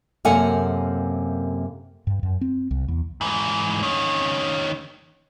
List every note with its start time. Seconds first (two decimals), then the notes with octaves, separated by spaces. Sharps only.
0.25 F#2 C3 A#3 A4 F#5 G#5
2.07 G2
2.23 F#2
2.41 C4
2.71 C2
2.88 E2
3.21 G#2 E3
3.83 D#3 C#4